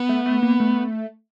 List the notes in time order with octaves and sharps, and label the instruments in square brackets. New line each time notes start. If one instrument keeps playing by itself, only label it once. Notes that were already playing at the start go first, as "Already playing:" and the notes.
Already playing: [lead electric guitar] B3
[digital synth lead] A3
A3
A#3
A3